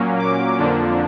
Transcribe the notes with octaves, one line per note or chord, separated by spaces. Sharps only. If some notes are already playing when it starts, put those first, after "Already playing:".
Already playing: A#2 F#3 A#3 C#4
D6
F2 D3 F3 A#3 D4